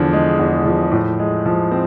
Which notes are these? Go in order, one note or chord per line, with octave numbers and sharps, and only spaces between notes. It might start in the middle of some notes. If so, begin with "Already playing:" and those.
Already playing: E2 D3 F3
G#3
E2
F3
A2
G#3
F3
C4